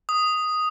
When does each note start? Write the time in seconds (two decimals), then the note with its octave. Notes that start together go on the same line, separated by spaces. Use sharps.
0.09 D#6